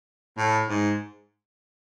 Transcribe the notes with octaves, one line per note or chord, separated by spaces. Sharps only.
A2
G#2